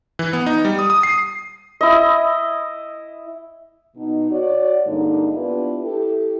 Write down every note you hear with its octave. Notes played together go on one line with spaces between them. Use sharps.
E3
B3
D#4
G3
D#6
D#6
C7
E4 D#5
B2 D#4
F#4 C#5 D5
G2 D3 G#3 A#3 D#4
B3 D4 E4 F4 G4 B4
E4 G4 A4